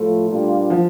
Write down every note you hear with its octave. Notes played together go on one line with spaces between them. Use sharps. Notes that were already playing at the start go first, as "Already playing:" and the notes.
Already playing: A2 F3 A3 F4
A#2 G3 A#3 D4 F4
F3